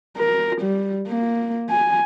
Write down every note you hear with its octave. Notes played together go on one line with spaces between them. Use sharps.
A#4
G3
A#3
G#5